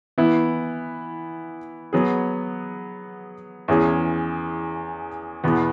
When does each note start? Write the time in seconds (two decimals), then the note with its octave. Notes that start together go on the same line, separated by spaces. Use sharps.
0.18 E3 B3 E4
1.93 F#3 B3 G#4
3.68 E2 E3 C#4 G#4
5.44 E2 B2 B3